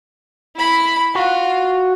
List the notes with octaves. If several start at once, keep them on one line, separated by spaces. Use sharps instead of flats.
E4 B5
F4 F#4